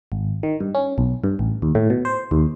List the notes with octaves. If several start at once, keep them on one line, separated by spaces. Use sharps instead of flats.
G#1
D#3
G2
C#4
B1
G2
A1
D#2
A2
B2
C5
D#2